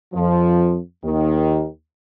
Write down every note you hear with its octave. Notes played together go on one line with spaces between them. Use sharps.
F2 F3
D#2 D#3